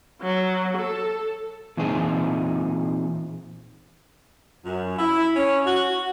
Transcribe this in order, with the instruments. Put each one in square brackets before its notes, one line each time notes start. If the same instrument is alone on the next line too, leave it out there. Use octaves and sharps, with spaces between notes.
[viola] F#3
A4
[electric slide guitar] A#2 E3 C4 D#4 G#4
[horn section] F#2
E4
C#4
F#4